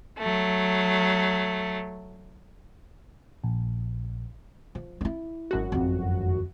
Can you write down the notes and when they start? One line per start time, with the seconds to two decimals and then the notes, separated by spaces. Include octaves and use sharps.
0.18 F#3 A3
3.44 A#1
4.75 F3
5.01 D#4 E4
5.51 G#1 F#2 F#4
5.72 F2 D3